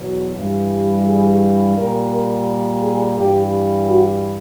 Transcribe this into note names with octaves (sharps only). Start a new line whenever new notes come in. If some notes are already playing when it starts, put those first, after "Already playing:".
Already playing: E2 B2 F#3
G2 E3 G3
G#4
A#2 G3 A#4
A#4
G#4
G2 E3 G3 G4
F#4